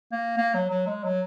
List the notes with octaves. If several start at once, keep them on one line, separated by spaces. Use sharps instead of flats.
A#3
A#3
F#3
F#3
G#3
F#3